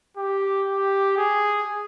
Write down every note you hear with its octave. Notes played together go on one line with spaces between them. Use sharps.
G4
G4
G#4